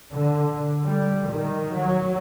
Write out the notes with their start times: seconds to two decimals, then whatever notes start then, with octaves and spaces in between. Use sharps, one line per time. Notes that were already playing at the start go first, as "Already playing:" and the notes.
0.12 D3
0.85 G3
1.30 D#3
1.76 F#3